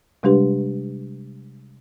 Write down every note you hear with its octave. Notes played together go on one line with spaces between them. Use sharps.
C3 G3 G#3 D4 G4 B4